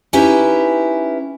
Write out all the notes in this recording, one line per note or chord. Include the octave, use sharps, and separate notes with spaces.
C#4 D#4 E4 G4 B4